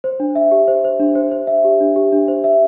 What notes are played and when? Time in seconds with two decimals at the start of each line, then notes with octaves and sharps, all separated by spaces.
0.04 C5
0.20 D4
0.35 E5
0.51 G4
0.68 C5
0.85 C5
1.00 D4
1.15 C5
1.32 C5
1.47 E5
1.64 G4
1.80 D4
1.96 G4
2.12 D4
2.28 C5
2.44 E5